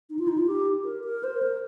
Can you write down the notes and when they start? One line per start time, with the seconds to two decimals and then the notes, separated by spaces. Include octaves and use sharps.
0.10 D#4
0.19 F4
0.28 D#4
0.38 F4
0.47 G4
0.85 A#4
1.04 A#4
1.24 C5
1.43 A#4